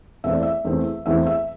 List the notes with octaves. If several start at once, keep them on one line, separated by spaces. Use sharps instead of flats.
E2 E3 A3 C4 E5
D5
E5
E2 E3 A3 C4
E2 E3 A3 C4 E5
E5